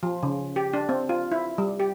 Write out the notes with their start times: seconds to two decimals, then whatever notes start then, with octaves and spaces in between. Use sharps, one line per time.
0.03 F3
0.23 C#3
0.56 G4
0.73 D4
0.89 C4
1.09 F4
1.32 E4
1.58 G3
1.80 G4